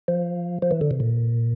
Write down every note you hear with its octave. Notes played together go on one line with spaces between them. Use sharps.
F3
F3
E3
D3
C3
A#2